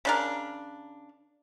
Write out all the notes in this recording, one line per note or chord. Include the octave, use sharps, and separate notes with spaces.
C#3 D4 A#4